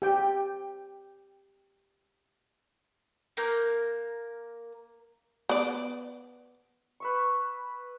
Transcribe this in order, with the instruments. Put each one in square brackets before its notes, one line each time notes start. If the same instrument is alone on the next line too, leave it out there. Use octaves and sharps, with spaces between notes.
[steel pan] G4 G5
[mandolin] A#3 A#4 G6
[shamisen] B3 D5
[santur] B4 E5 C#6